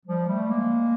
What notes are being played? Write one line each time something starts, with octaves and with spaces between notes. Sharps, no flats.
F3 G3
G3 A3
G#3 A#3